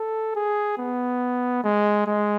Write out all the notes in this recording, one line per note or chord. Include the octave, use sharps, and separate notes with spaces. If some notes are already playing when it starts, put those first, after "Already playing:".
Already playing: A4
G#4
B3
G#3
G#3